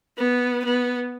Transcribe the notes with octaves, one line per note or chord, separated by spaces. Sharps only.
B3
B3